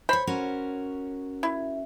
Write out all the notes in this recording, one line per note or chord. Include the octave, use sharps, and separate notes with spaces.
C5 C#5 D#5 B5 C6
C#4 F#4 A#4
E4